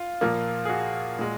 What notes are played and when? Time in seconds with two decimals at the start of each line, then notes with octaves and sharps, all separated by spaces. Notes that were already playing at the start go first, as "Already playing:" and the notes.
Already playing: F4
0.21 A#2 F3 A#3
0.65 G#4
0.69 F#4
1.19 A#2 G#3